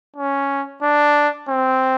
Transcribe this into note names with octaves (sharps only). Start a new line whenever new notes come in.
C#4
D4
C4